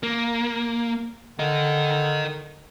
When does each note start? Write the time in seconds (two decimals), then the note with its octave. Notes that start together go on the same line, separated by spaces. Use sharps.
0.03 A#3
1.39 D3 A#4 D#5